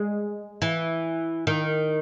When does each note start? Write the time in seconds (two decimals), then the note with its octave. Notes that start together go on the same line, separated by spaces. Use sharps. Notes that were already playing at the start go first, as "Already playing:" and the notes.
Already playing: G#3
0.62 E3
1.47 D#3